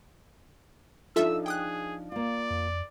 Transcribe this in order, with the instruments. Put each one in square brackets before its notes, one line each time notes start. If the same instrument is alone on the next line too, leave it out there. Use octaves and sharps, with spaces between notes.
[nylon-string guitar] F3 D4 D#4 [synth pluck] F4 A4 E5 [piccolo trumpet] E6
[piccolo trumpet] G#4 [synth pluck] G5 D#6 F#6
[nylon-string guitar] A#3 F4 [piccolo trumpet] D5
[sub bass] F2